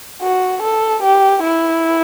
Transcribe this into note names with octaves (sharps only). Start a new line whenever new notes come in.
F#4
A4
G4
E4